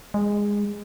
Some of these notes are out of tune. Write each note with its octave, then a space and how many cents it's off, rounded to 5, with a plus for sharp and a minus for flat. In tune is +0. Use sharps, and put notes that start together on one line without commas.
G#3 -15